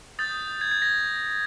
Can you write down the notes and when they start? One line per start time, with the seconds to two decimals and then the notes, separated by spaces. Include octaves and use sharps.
0.19 D#6 G6 A6
0.61 G#6
0.71 G#6
0.82 A#6